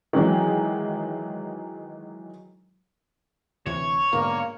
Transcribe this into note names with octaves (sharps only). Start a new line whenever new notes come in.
D#3 E3 F#3 G#3
D2 C3 E3 C#5
G#2 B2 D3 A#3